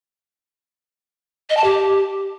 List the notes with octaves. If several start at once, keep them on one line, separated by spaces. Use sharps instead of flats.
D#5
A5
G4